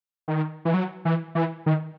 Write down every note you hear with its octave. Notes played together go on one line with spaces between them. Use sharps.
D#3
E3
F#3
E3
E3
D#3